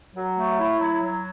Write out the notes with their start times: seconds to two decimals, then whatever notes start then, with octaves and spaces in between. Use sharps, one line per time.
0.16 F#3
0.37 A3
0.59 E4
0.80 F#3
1.02 F#3